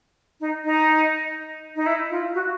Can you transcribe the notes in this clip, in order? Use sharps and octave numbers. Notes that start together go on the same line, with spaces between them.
D#4
D#4
D#4
E4
F4
F#4